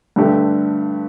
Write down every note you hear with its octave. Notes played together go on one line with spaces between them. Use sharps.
G2 D3 A3 G4